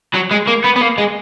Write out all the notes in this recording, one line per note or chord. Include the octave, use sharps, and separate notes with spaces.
F#3
G#3
A#3
B3
B3
A#3
G#3